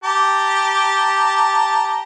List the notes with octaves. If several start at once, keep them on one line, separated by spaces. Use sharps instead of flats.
G4 A5 A#5